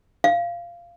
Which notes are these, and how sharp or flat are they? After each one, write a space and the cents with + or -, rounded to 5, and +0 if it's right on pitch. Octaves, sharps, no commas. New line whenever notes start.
F5 -15